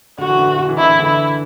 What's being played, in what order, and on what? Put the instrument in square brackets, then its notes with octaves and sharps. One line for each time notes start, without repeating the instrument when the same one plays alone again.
[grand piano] D3 [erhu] F#4
[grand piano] E3
D3
E3
D3
E3
[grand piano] D3 [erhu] E4
[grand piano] E3
D3
[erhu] E4